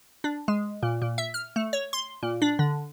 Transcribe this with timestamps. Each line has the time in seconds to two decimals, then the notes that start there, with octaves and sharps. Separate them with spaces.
0.24 D4
0.48 G#3
0.83 A#2
1.02 A#2
1.18 E5
1.34 F6
1.56 A3
1.73 C#5
1.93 C6
2.23 A#2
2.42 D4
2.59 D3